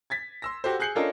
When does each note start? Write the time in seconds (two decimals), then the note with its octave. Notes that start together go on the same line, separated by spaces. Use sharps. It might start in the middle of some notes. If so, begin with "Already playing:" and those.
0.10 G#6 A6 B6
0.42 C6 E6 A#6
0.64 F#4 G4 A4 C5
0.80 G#4 F#6 G6 C7 C#7 F#7
0.95 C#4 D4 F4 A4 A#4 D#5